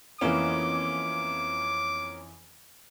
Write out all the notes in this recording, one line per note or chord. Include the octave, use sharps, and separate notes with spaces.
F2 E3 A#3 B3 C#4 D6